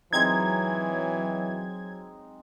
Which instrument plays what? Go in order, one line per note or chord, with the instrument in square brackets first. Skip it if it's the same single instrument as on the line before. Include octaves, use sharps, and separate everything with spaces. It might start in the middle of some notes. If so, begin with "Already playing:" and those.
[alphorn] E3 [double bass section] F#3 [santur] G#3 C4 D#4 [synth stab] G#6